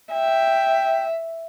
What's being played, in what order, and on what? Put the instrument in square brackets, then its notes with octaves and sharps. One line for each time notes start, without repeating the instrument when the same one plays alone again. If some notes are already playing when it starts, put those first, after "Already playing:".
[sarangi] E5 [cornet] G5